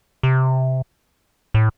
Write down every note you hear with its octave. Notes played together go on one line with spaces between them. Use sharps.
C3
A2